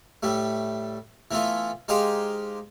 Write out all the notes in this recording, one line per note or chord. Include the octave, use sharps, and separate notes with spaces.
A2 G3 A3
E3 A3 B3 F4
G#3 D#4 G4 C5 F5